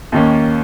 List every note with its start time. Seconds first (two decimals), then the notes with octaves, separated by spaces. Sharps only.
0.12 D#2 D#3 A#3 C#4